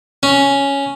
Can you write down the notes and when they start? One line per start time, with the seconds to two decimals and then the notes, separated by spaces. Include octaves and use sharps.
0.23 C#4